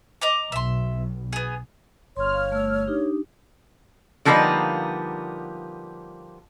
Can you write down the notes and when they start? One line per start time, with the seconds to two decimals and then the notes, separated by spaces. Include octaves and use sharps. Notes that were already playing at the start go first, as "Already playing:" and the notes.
0.21 D#5 A#5 D6
0.52 B1 B2 E5 C6
1.33 B3 G#4
2.17 G1 C#5 C6 F6
2.34 F5
2.52 A3 E6
2.88 D4 D#4 G4
4.25 D3 F3 G3 A#3 B3 D#4